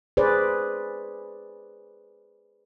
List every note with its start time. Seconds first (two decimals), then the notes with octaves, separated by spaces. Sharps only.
0.17 G#4 B4 C5 D5